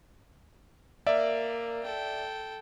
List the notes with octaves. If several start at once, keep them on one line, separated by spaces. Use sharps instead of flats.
A#3 A#4 D5 E5
A4 G5